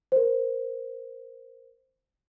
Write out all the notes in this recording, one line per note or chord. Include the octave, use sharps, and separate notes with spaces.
A#4 C5